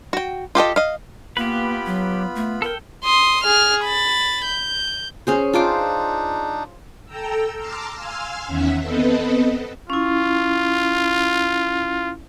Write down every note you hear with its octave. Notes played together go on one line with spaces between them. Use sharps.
F#4 G5
F4 G4 A4 D#5
D#5 F5
A#3 B3 F4 G4 B4 B5
F#3
A3
A4 A#4 G5
C6 D#6
G#4 F6
B5 A6
G6
C#4 G#4 C5
D4 D#4 F4 C5 D6
A4 G5 A#5 E6
A5 A#5 C6 D6 E6 F6
F5 G#5 C6 E6 F6
E2 D#3 C#4 E5 F#5 B6
B3 C4 A4 B4 D#5
C#4 E4 F4